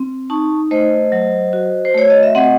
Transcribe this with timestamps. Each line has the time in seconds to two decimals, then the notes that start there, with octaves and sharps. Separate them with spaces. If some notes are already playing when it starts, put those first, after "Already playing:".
Already playing: C4
0.30 D#4 A5 C#6
0.71 A3 C5 D#5
1.12 F#3
1.53 F#4
1.85 C5
1.94 A3 C#5
2.10 D#5
2.23 E5
2.35 C4 D#5 F#5